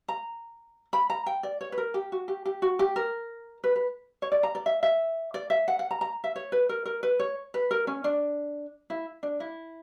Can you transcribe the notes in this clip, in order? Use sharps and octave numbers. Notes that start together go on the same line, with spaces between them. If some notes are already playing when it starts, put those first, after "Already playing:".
A#5
B5
A#5
G5
D5
C#5
B4
A#4
G4
F#4
G4
G4
F#4
G4
A#4
B4
B4
C#5
D5
A#5
D5
E5
E5
D5
E5
F#5
F#5
A#5
A#5
E5
C#5
B4
A#4
A#4
B4
C#5
B4
A#4
C#4
D4
E4
D4
E4